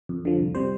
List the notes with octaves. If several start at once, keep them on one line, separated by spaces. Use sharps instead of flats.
F2
D3 F3
C2
C3 G3 C5